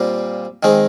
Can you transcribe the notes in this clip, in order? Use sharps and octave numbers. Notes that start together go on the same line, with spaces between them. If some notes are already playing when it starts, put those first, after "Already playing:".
Already playing: A#2 G3 C4 G4
D#3 G#3 C4